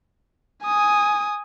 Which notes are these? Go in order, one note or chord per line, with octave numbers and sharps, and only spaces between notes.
G#5 D#6